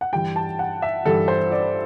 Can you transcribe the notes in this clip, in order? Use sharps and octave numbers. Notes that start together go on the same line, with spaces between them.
F#5
G2 E3 G3 G5
A5
F#5
E5
G2 E3 G3 A4
C5
D5